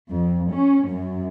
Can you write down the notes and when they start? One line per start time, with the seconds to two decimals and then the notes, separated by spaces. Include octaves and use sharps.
0.11 F2
0.52 C#4
0.87 F#2